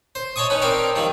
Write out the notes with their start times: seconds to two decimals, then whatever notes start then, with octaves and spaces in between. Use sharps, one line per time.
0.15 C5
0.36 C#5 D#5 A5 C#6 D#6
0.50 C#4 D#4 B4
0.62 C4 D#4 A#4 D5 A5
0.96 D#3 F3 G3 D#4